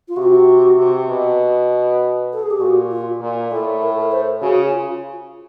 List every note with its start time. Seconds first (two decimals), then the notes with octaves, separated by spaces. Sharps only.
0.08 F4
0.16 C3 F#4
0.77 C3
1.08 B2
2.33 A4
2.42 G#4
2.50 G4
2.60 A#2 F#4
2.90 F4
3.20 A#2
3.51 A2 A4
3.82 A#4
3.91 A4
4.00 A#4
4.11 C5
4.41 C#3 F#4
4.71 F4